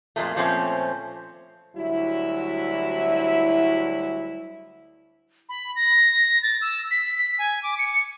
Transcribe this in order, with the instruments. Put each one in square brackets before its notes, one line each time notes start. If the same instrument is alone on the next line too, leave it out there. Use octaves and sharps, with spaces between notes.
[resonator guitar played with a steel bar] F2 A#2 G#3 A3
A#2 F3 A3 C4 C#4
[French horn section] D2 F#3 G3 E4
[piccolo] B5
A#6
A6
E6
B6
B6
G#5
D6
C#7